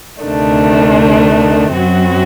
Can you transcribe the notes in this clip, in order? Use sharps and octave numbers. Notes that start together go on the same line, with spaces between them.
D2 C3 D#3 A3 D4
F#2 F#3 C4 F#4